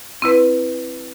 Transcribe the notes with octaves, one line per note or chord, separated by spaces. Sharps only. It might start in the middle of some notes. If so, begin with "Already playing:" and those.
C4 E4 B4